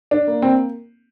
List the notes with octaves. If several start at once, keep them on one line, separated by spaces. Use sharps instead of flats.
D4
A#3
C4